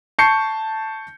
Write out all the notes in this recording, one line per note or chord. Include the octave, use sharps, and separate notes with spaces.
A5 C#6 G6 C7 C#7